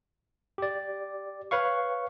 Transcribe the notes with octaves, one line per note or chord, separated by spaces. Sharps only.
G4 D5
B4 C#5 F5 C#6